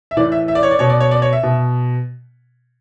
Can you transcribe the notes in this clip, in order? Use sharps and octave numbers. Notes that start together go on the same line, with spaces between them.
E5
A2 E3 D5
E5
E5
D5
C#5
D5
B2 C#5
D5
C#5
D5
C#5
E5
B2